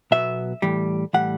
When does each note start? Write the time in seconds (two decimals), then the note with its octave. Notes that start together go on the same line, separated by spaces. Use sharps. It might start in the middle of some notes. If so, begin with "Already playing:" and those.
0.11 B1 B2 F#3 B3 E5
0.62 A2 E3 G3
1.13 A2 E3 G3 F#5